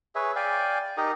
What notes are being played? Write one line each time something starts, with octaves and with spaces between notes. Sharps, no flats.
G#4 B4 C#5 E5
D5 F5 G5 G#5
D#4 G4 A#4 D#5